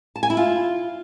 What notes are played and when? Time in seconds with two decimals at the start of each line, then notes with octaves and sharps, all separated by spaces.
0.16 A5
0.23 G#5
0.30 E4
0.37 F4